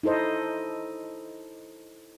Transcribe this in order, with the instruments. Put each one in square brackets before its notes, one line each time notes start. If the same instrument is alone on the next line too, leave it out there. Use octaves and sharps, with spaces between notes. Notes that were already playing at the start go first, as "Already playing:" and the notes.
[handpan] D#4 E4 A4 C5 D#5